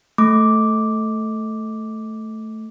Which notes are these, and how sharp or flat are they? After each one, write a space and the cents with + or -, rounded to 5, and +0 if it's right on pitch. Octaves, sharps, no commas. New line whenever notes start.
A3 +0 D6 +0